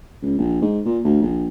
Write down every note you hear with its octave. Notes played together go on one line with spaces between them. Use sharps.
C#2
A#1
G#2
A#2
D2
A#1